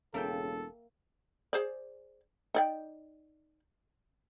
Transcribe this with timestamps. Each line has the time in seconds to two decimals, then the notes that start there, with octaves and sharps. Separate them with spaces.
0.14 E1 C#3 A#3 A4 E5 G5
1.53 G#4 C5 D5
2.55 D#4 D5 G5